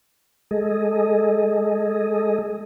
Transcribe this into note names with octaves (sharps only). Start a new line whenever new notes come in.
G#3 G#4 A4 D#5